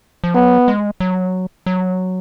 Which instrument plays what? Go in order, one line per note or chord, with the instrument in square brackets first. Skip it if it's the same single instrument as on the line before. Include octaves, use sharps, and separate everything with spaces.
[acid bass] F3
[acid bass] F#3 [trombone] B3
[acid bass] G#3
F#3
F#3